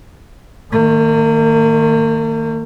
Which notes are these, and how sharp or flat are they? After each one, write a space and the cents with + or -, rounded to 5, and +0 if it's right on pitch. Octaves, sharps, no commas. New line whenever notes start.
D#3 +0 A#3 -40